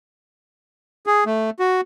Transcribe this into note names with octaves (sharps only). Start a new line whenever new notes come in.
G#4
A3
F#4